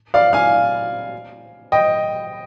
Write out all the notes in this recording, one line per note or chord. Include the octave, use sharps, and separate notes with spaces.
D5 F5
F5 G#5
D#5 G5